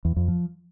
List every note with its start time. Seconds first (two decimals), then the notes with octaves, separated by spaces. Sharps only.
0.05 E2
0.16 F2
0.28 F3